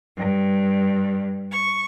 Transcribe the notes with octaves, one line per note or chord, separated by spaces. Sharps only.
G2
C#6